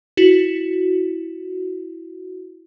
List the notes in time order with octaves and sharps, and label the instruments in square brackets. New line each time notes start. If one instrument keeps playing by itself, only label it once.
[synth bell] E4 F#4